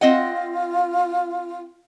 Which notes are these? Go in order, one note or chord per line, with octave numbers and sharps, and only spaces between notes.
C4 F4 D#5 F#5